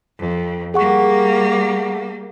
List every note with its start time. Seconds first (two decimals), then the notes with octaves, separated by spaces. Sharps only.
0.18 F2
0.74 G3 A#3 G#4 F#5 C#6